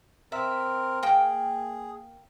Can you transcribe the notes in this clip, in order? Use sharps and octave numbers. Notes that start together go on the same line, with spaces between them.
C4 A#4 E5
A#3 G#4 G5